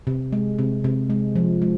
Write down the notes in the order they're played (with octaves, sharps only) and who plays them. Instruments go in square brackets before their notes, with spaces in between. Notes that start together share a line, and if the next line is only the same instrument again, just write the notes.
[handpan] C3
G#3
C3
C3
G#3
F3
G#3